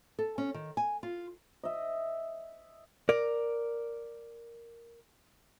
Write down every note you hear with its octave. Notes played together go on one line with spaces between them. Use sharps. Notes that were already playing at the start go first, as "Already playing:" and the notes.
A4
C#4
D#3
G#5
F4
D#5 E5
A#4 D5